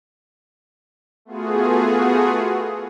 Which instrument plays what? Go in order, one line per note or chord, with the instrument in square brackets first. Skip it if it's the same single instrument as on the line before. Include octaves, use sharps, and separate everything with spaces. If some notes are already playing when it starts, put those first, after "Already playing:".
[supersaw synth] A3 B3 F4 F#4 G#4